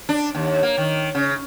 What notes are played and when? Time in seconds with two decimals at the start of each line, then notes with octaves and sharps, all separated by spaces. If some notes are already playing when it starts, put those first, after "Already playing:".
0.09 D4
0.35 D#2
0.63 A#3
0.78 D#3
1.15 C#3